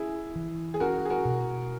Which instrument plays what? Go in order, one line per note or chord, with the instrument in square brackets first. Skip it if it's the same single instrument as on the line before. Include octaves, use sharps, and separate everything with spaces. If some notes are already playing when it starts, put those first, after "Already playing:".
Already playing: [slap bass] C#4 [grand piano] E4 G#4
[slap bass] E3
[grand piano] G#4
[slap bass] C#4 [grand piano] F#4 A#4
[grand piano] G#4
F#4 A#4
[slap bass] B2